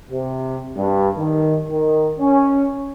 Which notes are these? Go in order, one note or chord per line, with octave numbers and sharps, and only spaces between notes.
C3
G2
D#3
D#3
C#4